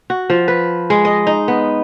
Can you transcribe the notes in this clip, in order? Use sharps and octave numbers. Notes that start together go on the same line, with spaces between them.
F#4
F3
B4
G#3
D#5
D#4
B3